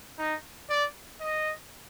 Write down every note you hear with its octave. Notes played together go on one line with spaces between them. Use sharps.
D#4
D5
D#5